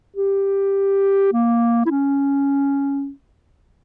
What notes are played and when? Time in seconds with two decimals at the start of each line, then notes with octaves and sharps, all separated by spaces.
0.16 G4
1.33 A#3
1.86 E4
1.90 C#4